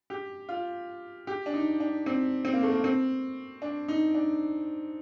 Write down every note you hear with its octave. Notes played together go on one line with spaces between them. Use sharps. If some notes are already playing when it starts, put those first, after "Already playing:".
G4
F4
G4
D4
D#4
D4
C4
C4
A#3
A3
A#3
C4
D4
D#4
D4